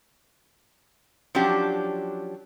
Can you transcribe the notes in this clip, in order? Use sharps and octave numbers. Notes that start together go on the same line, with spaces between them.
F3 F#3 C#4 D4 G4